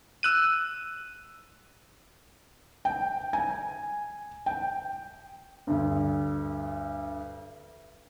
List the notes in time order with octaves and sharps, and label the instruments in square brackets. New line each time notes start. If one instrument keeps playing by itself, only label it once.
[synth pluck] E6 F#6 D#7
[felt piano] G5
G#5
G5
D2 G2